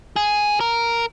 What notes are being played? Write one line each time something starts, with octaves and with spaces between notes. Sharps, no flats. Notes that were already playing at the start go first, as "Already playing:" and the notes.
G#4
A#4